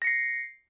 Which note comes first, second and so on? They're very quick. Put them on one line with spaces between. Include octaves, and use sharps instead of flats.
A#6 C#7 C7